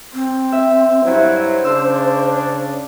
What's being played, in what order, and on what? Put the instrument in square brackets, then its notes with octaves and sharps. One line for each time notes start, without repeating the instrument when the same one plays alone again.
[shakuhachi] C4
[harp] E5
[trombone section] G2 F#3 E4 [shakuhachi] C5
[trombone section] C#3 D4 [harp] C6 E6